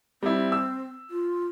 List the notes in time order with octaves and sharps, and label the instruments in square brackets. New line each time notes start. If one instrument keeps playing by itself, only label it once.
[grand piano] G3 E4 [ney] C4
[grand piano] E6
[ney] F4